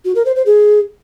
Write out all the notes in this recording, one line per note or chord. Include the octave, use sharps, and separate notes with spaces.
F#4
A#4
C5
C5
G#4